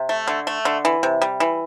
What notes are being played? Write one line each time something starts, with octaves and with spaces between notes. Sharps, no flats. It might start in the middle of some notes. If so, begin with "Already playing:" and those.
Already playing: C3
A3
D3
A3
D3
E3
C3
G3
E3